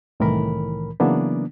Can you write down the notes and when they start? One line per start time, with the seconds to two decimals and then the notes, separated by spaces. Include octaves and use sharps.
0.20 C2 A2 D#3 E3 A#4 B5
1.00 C#3 E3 F#3 A#3 B3 D4